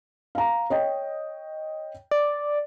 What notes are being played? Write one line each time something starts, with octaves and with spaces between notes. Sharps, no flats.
F5 A#5
C#5 D#5 G5
D5